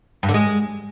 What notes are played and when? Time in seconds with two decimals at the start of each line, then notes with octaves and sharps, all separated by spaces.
0.23 G2
0.29 D3
0.34 G#3